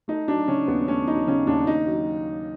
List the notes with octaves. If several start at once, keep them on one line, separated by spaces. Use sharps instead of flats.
A3 D#4
F#3 D4
C#3 C#4
D#2 B3
A3 C#4
F#3 D#4
C#3 C#4
D#2 D4
D#2 D#4
F#3